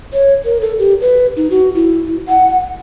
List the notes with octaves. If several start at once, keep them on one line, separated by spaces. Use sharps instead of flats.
C#5
A#4
A4
G4
B4
D#4
F#4
E4
F#5